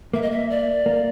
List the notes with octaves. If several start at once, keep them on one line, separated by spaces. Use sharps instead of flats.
A#3 E5
D#5
E5
D5
A#3